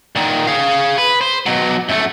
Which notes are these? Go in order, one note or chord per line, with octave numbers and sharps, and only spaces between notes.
A#2 D#3
G#4 F5
B4
C5
B2 F#3
F#2 A3